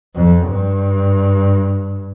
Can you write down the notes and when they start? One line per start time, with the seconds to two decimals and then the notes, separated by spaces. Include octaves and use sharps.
0.15 F2
0.46 G2